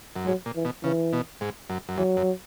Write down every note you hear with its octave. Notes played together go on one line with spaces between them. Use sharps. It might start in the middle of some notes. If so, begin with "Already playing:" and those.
F#2
G#2 F#3
A#2
E3
B2
C#3 E3
B2
G#2
F#2
F#2
E2 F#3
F#2